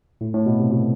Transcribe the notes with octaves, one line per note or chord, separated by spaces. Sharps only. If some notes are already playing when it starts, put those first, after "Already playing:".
A2
A2
B2
C3
B2